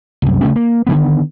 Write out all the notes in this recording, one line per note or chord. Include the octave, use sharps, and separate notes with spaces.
C2 F#2
C#3 A3 C#4
A#3
D3 D#3 B3